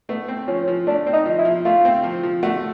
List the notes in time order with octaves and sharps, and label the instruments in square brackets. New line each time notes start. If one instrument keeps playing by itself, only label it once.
[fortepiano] A3 [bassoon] B3
[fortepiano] C4
[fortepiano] F3 [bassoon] C#4
[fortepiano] F3
[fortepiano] A3 [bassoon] D4
[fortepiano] C4
[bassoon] D#4
[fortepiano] F3
[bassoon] E4
[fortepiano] F3
[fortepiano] A3 [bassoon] F4
[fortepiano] C4
F3
F3
[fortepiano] A3 [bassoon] F#4